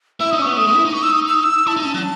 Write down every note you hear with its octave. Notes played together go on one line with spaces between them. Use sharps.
E4 E6
D#4 D#6
C#4
B3 C#6
A3 D#6
G#3
E4
D#4 D#6
C#6
E6
D#6
E6
D#6
E6
E4 A5
D#4
C#4
F#3